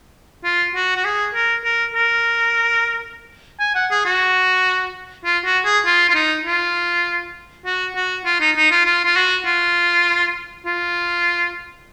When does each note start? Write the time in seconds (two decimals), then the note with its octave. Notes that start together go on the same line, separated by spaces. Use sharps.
0.44 F4
0.75 F#4
0.97 F#4
1.05 G#4
1.35 A#4
1.65 A#4
1.95 A#4
3.60 G#5
3.75 F#5
3.91 G#4
4.05 F#4
5.25 F4
5.45 F#4
5.65 G#4
5.86 F4
6.09 F4
6.15 D#4
6.46 F4
7.65 F#4
7.96 F#4
8.25 F4
8.40 D#4
8.56 D#4
8.71 F4
8.86 F4
9.05 F4
9.16 F#4
9.46 F4
10.66 F4